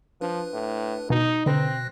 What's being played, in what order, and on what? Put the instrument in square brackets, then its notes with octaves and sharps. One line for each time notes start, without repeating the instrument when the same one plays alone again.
[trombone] F3 [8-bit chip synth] D4 B4
[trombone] A2
[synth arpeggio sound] B2 [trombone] D#4
[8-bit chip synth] B2 F#6 A#6 [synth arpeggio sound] D3 B4 [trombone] C4